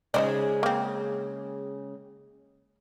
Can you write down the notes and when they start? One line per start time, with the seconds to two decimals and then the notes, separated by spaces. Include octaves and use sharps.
0.14 C#3 G#3 D#4 C5 D5
0.63 A#3 C4